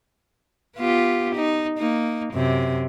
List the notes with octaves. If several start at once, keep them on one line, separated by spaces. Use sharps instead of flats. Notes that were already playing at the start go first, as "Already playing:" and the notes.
B3 F4 G4
D#4
A#3 D#4
F#2 C3